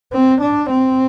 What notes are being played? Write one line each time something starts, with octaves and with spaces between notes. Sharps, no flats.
C4
D4
C4